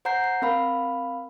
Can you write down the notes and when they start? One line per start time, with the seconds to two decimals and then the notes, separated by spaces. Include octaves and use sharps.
0.05 C5 F#5 A#5 G6 C7
0.24 C7
0.42 C4 A#4 F5 B5